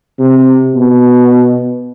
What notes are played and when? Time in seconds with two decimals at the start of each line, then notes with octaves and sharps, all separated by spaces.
0.19 C3
0.75 B2